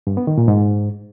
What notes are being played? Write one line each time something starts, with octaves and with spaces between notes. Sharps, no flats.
G2
B3
D#3
A#2
G#2